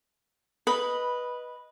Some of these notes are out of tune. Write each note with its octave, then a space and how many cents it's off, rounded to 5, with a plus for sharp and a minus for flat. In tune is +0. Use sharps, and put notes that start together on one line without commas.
B4 -10 D#5 +0 B5 +0